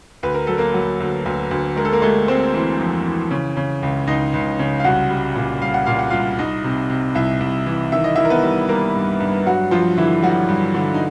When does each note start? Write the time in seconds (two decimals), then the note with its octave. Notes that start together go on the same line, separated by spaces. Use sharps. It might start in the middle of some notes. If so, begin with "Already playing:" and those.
0.23 D2 B4
0.34 A#4
0.47 F#3 A4
0.58 A#3 A#4
0.74 F#3
1.00 D2
1.26 D2
1.51 D2
1.76 G#3 A#4
1.85 A4
1.92 A#3 A#4
2.02 G#3 A3 A4
2.28 G#3 C4 C5
2.54 E3
2.79 F2
3.05 E3
3.31 C#3
3.57 C#3
3.83 C#2
4.07 C#2 D#4 D#5
4.34 C#2
4.59 C#3
4.80 F5
4.84 C2 F#4 F#5
5.11 G3
5.35 A#2
5.62 G3 F5
5.74 F#5
5.86 A#2 F5
5.99 F#5
6.10 C2 F4 F5
6.38 C2 D#4 D#5
6.64 C3
6.89 C3
7.15 C2 E4 E5
7.40 C2
7.66 E3
7.92 D#3 E5
8.04 D#5
8.15 D#3 E4 E5
8.25 A#4
8.30 B3 B4
8.44 G3
8.69 G3 A#3 A#4
8.95 G2
9.20 G2
9.46 G2 F#3 F#4
9.71 G2 F3 F4
9.98 D3 E3 E4
10.23 F#3 G3 F#4
10.48 G2
10.74 D3
10.94 D#4